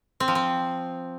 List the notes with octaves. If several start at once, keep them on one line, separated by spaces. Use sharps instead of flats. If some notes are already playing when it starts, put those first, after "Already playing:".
C4
F3
C4